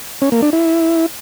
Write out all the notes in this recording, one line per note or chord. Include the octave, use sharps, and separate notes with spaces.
C#4
A#3
D4
E4